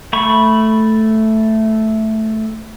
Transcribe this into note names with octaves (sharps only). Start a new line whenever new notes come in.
A3 B5 C#6